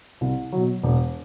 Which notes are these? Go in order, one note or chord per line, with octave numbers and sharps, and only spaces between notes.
C2
B2 F#3
E1